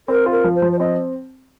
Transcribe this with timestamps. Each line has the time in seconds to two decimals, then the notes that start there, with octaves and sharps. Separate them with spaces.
0.08 C4 A#4
0.26 F4
0.32 A#4
0.44 F3
0.55 C5
0.62 F3
0.72 C5
0.79 C4 D#5